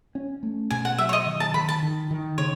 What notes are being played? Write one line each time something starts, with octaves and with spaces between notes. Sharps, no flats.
C#4
A3
B2 G#5
F#5
F#3 E5
C#5
D#5
D#3
A5
D#3 B5
A5
D#3
D#3
C#3 C#5